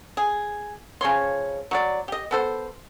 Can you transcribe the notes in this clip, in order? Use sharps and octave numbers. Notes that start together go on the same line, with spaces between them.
G#4
C#3 F3 C#5 C6
F#3 D#4 D5
G4 D#5
B3 A4 C5